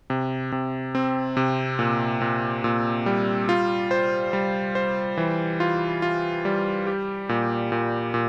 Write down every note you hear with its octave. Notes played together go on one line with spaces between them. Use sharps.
C3
C3
C4
C3
A#2
A#2
A#2
G3
F4
C5
G3
C5
E3
F4
F4
G3
G4
A#2
A#2
A#2